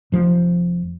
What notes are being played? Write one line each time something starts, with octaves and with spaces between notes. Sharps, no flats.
F1 F3